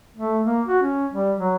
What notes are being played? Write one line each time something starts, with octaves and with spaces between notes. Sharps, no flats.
A3
A#3
F#4
C#4
G3
F#3